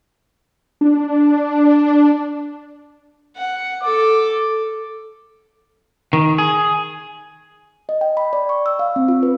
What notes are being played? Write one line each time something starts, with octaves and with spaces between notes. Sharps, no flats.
D4
F#5
A4 D6
D#3
G#4
D#5
G5
B5
D5
C#6
E6
F5
C4
F4
B4